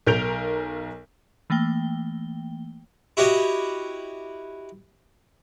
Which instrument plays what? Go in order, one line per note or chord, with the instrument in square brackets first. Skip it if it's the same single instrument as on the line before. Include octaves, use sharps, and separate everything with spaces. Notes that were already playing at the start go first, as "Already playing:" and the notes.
[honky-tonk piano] B1 A#4 G6 D7 F7
[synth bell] E3 A3 A#3 G5 G7
[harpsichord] E4 F#4 G4 C#5 D#5